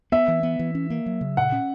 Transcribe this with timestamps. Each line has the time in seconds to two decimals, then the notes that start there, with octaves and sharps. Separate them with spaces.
0.12 B3 E5
0.28 E3
0.43 B3
0.59 E3
0.75 C#4
0.90 A#3
1.06 F#3
1.21 C#3
1.37 A#2 F#5
1.52 C#4